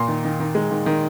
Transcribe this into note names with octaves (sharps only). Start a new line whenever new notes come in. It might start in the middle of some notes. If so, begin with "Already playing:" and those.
Already playing: A#2 C6
D#3
D#3
D#3
G#3
D#3
D#3